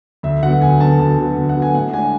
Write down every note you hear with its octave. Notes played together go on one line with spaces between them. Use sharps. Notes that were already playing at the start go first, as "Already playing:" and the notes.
D2 E5
D3 F#3 B3 F#5
D2 G#5
D3 F#3 B3 A5
D2 A5
D3 F#3 B3
D2
F#5
D3 F#3 B3
G#5
A2 F#5
G#3 D4 G#5